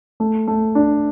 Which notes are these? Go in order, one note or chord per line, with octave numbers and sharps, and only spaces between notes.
A3
A3
D4